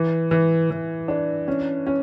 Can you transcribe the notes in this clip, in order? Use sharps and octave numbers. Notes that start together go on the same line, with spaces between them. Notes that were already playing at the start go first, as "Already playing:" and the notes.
Already playing: E3
E3
E3
D4
C#4
C#4